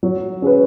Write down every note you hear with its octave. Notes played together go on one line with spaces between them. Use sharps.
F#3
C#4 G#4 B4